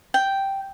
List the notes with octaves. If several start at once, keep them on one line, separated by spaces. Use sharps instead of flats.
G5